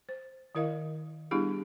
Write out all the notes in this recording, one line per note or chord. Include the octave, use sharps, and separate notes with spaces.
C5
D#3 E4 A#4 D#5 F5
G3 B3 D4 E4 G4 G#4